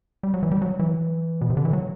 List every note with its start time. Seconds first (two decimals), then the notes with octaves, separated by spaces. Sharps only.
0.23 G3
0.34 F#3
0.43 E3
0.51 G3
0.62 F#3
0.79 E3
1.41 B2
1.50 C3
1.57 D3
1.65 E3
1.73 F#3